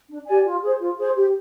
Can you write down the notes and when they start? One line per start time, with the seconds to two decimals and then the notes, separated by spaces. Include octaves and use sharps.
0.10 D4
0.27 G4 D5 G#5
0.45 F4
0.62 G#4 C5
0.80 F4
0.98 G#4 C5
1.15 G4